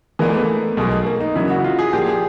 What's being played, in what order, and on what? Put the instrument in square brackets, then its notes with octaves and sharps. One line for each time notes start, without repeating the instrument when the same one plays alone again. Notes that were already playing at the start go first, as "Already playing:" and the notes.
[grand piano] E3 G#3 B3 D4 [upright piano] A#3
[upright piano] A3
A#3
[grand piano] B1 B2 G#3
[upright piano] A#3
D#4
[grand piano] E2 C#3 F#3 A#3 [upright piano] E4
[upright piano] F#4
F4
G#4
[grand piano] A#2 F3 A#3 D4 F4 [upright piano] G4
[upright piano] G#4